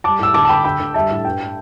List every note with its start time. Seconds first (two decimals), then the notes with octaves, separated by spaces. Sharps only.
0.04 G3 A5 D6
0.19 A2 E6
0.34 D2 A5 D6
0.45 A5
0.49 D2 G5 B5
0.64 D2 G5 B5
0.80 D2
0.94 G3 E5 A5
1.10 A2
1.25 G2 G5